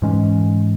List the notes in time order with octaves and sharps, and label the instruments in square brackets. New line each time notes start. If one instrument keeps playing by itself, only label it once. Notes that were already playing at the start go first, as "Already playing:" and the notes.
[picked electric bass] G#2 E3 G#3 C#4